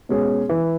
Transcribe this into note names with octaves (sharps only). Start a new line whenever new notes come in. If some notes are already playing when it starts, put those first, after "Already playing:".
B2 G#3 C#4 G#4
E3